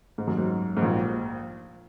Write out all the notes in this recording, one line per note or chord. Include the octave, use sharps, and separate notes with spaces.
G#2
F#2
G#2
G#2
A#1 A#2